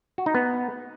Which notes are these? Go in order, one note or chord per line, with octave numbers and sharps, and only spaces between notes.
F#4
D#4
B3